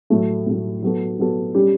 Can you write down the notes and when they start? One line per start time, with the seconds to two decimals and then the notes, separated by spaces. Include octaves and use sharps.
0.10 A2 F#3 A3
0.46 A2 F#3 A3
0.82 F#3 B3 F#4 A4
1.19 F#3 B3 F#4 A4
1.54 G3 C#4 G4